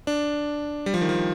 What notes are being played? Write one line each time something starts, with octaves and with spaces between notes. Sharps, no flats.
D4
G3
F3
D#3
F3